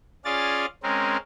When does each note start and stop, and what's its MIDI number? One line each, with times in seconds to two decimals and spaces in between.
0.25 0.66 61
0.25 0.66 65
0.25 0.66 68
0.25 0.66 74
0.25 0.66 77
0.25 0.66 93
0.83 1.17 56
0.83 1.17 60
0.83 1.17 61
0.83 1.17 70